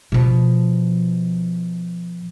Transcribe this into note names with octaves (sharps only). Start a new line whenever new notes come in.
B2 F3